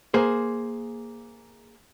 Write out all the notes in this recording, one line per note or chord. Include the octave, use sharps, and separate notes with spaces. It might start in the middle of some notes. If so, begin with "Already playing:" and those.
A#3 G#4 C5